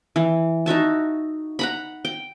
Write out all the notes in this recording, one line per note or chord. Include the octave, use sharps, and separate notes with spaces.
E3
D#4 F#4 E5 A5
F#5 A#5 B5
G5